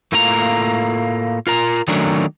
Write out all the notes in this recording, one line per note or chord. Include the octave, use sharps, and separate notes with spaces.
A2 A3 A#3 F4 B4 A#5
F4 A#4 A#5
D#3 F#3 A3 C#4 D4 A#4